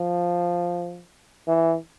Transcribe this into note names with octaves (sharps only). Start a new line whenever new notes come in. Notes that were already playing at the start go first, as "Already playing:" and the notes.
Already playing: F3
E3